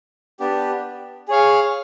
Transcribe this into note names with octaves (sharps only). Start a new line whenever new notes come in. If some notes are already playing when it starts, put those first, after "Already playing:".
B3 D4 G4
G#4 C#5 F5